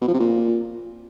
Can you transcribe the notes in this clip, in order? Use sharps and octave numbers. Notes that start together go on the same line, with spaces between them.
B2
F3
C3
A#2